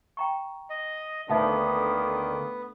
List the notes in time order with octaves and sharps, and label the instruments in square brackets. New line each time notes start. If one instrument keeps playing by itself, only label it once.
[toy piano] G5 A#5 C#6
[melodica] D#5
[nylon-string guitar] D2 [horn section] D3 D#3 A#3 [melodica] B3 [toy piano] D#4 E5 A5